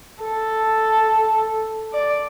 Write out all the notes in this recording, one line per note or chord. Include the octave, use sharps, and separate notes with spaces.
A4
D5